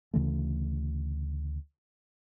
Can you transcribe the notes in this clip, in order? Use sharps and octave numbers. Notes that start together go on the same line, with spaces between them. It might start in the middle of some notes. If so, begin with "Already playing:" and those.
D2 C#3 E3 A3